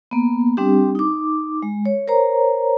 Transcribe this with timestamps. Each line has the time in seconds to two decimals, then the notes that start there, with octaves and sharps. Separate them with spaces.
0.11 A#3 B3
0.57 G3 C4 D4 G4
0.95 D#4 D6
1.62 G#3
1.86 C#5
2.08 A#4 C5 C#5 A#5